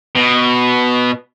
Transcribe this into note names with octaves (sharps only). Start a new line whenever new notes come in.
B2